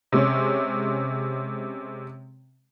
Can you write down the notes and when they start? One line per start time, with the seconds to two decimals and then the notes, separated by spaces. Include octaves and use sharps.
0.12 C3 G#3 C#4